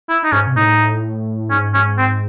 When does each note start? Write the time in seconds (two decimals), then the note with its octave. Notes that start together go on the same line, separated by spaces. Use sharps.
0.09 E4
0.24 D#4
0.32 G#2 C#4
0.47 C3
0.56 A2 D#4
1.50 G#2 C#4
1.74 C#4
1.98 C4